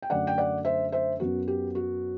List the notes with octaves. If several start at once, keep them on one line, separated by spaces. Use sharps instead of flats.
G5
F#2 D3 A3 D5 F#5
G5
D5 F#5
C5 E5
C5 E5
F#2 F#3 B3 F#4
G4
F#4